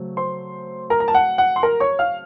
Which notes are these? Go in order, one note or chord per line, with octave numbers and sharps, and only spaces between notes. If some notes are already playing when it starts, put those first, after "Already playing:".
Already playing: C#3 F#3 A3 C4
C5 C6
A#4 A#5
A#5
A5
F#5
F#5
C6
A#4 A#5
C#5 C#6
F5 F6